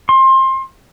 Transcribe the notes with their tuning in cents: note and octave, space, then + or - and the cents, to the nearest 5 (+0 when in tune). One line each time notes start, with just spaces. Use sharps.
C6 +25